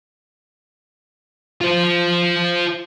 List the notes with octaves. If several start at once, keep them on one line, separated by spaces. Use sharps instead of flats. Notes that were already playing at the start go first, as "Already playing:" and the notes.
F4 C5